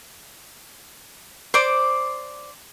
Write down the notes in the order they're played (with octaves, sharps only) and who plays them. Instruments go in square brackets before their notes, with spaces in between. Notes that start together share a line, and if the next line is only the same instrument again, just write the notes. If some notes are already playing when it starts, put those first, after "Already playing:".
[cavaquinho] C5 D5 D6